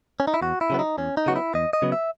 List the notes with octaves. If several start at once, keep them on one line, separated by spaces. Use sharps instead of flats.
C#4
D#4
E4
E2 F#4
E4
C#3 F#3 B3
D#4
E2 C#4
D#4
C#3 F#3 B3 F#4
E4
E2 D#5
D#5
C#3 F#3 B3
E5